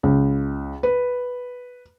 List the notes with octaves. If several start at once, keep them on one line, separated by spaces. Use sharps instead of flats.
C#2
B4